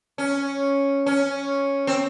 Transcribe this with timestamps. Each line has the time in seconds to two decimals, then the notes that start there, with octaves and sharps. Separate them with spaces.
0.18 C#4
1.06 C#4
1.87 C4